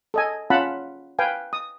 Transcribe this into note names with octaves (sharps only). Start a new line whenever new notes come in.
A4 D#5 G#5
C#4 F4 F5 F#5 A5 B5
B4 F5 G5 G#5
D#6